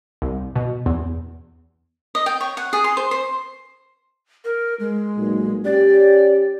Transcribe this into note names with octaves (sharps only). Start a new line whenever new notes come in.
C2
B2
E2
D#5
G5
C#5
F#5
G#4
C6
C5
C5
A#4
G#3
B1 A#2
C#4 G4 D5